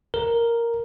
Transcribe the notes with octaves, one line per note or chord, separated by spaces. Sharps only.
A#4